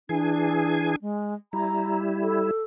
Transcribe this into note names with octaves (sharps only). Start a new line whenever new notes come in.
E3 D4 G#4 G#5
G#3
G3 E4 A#5
A4